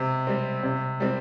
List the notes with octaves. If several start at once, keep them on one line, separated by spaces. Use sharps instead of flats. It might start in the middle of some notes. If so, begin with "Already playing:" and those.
Already playing: C3
G3 C4
C3
G3 C4